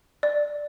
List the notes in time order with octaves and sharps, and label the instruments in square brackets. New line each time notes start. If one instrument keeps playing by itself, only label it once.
[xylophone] D5